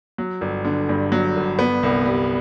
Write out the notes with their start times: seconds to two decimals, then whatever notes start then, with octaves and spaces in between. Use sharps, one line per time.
0.18 F#3
0.41 G1
0.65 D3
0.89 G2
1.12 F#3
1.36 G1
1.59 B3
1.83 C2
2.05 G3